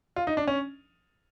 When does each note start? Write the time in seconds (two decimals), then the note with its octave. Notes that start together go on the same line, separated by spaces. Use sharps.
0.16 F4
0.27 D#4
0.37 D4
0.48 C#4